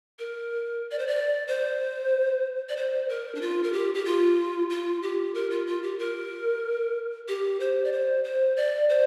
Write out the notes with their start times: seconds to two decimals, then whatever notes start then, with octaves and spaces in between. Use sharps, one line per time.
0.19 A#4
0.91 D5
0.99 C5
1.07 D5
1.48 C5
2.69 D5
2.77 C5
3.09 A#4
3.35 D4
3.42 F4
3.63 A#4
3.73 G4
3.95 G4
4.05 F4
4.70 F4
5.03 G4
5.34 A#4
5.51 F4
5.67 F4
5.83 G4
5.99 A#4
7.28 G4
7.60 C5
7.84 D5
7.92 C5
8.24 C5
8.57 D5
8.89 C5